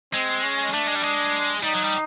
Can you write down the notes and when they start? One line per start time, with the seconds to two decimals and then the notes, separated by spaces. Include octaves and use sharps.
0.13 G#3 C4
0.43 C#4
0.73 A3 D4
0.88 G#3
0.95 G3
1.02 G#3
1.63 G3 D#4
1.73 F#3
1.83 G3